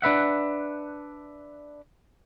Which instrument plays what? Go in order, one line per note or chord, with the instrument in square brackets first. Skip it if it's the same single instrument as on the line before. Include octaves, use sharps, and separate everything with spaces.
[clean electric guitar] D4 B4 E5 F#5